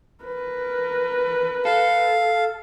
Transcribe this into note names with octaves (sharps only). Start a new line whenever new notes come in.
A#4 B4
A4 F5